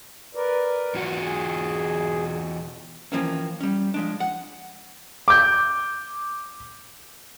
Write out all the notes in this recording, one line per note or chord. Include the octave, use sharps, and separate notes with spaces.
A#4 B4 D5
E2 F4 F#4
G#4
E3 F3 A#3 C4 C#4
G3 C#4
F3 G#3 D4
F#5
D6 G6